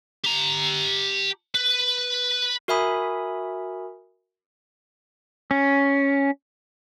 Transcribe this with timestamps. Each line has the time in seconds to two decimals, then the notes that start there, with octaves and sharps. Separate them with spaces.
0.25 G4 A#5
1.55 B4
2.68 F#4 A#4 E5 G#5 B5 D#6
5.51 C#4